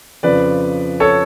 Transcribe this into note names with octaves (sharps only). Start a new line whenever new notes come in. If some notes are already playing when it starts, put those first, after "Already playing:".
F2 C#3 F3 B4 D5
A4 C#5